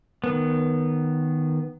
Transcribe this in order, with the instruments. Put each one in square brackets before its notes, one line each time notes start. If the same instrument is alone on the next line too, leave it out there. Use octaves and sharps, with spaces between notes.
[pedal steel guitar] D#3 B3